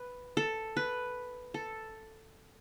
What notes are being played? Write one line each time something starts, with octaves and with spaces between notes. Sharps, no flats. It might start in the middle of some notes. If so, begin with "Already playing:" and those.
Already playing: B4
A4
B4
A4